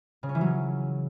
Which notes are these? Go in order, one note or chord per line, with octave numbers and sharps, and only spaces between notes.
C#3
C#4
E3
F#3